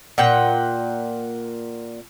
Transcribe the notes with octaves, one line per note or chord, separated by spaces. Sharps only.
A#2 F#5 G5